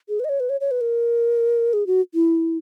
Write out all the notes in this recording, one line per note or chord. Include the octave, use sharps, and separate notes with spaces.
G#4
B4
D#5
C#5
B4
C#5
C#5
B4
A#4
G#4
F#4
E4